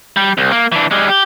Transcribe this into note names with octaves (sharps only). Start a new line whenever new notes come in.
G3
C2
A#3
E3 D4
G3 G#3
G4